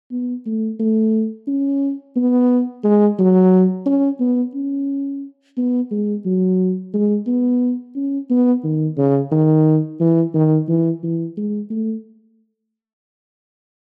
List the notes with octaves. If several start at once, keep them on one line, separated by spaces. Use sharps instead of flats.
B3
A3
A3
C#4
B3
G#3
F#3
C#4
B3
C#4
B3
G#3
F#3
G#3
B3
C#4
B3
D#3
C#3
D#3
E3
D#3
E3
E3
G#3
A3